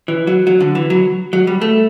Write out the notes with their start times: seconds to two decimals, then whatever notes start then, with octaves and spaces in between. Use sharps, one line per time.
0.08 E3
0.27 F#3
0.47 F#3
0.60 D3
0.75 E3
0.90 F#3
1.33 F#3
1.47 G3
1.61 A3